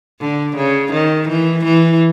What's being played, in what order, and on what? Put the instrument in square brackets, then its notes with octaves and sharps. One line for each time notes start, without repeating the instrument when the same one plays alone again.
[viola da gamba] D3
C#3
D#3
E3
E3